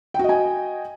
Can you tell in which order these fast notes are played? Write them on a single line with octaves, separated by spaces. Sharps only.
G5 F#4 D#5 G#5